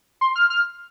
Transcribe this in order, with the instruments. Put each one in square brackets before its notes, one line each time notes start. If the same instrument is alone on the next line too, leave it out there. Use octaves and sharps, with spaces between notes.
[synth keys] C6
F6
F6